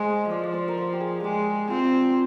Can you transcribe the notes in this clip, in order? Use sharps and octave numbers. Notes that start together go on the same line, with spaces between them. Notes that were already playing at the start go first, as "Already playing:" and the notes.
Already playing: G#3 C5 D#5
F3 D5
D5
C5
A#4
C5
G4
G#4
G#3 G4
C4 F4